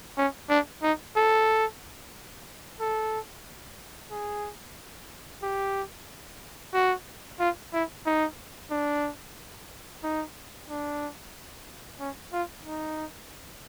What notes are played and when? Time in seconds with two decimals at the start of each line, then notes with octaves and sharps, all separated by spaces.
0.17 C#4
0.49 D4
0.82 D#4
1.16 A4
2.80 A4
4.11 G#4
5.43 G4
6.74 F#4
7.40 F4
7.73 E4
8.06 D#4
8.71 D4
10.03 D#4
10.69 D4
12.00 C#4
12.33 F4
12.65 D#4